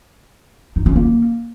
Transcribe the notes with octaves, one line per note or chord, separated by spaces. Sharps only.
D#4
C#4
A#3